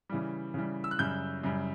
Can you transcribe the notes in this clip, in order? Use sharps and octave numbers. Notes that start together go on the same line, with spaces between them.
C#3 E3 G3
C#3 E3 G3
E6
F#6
F#2 C#3 G3 G6
F#2 C#3 G3